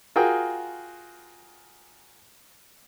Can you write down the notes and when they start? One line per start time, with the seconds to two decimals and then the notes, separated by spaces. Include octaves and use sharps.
0.16 F4 F#4 G#4 A#4 G5 D#6